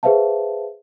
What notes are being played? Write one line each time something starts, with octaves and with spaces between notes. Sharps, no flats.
G#4 B4 C5 E5 F5 A5